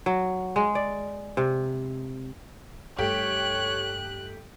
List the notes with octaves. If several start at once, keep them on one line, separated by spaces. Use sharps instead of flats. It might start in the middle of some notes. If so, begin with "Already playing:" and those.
F#3
G#3
D5
C3
G2 A3 G4 C#5 F#6